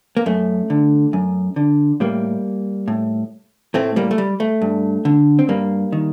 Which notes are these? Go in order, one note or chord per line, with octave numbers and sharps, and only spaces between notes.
A#3
F#2 A3
D3
F#2
D3
A2 G3 A#3
A2
A2 A3 C4
G3 A#3
A3
G3
A3
G2
D3
C4
G2 G3 A#3
D#3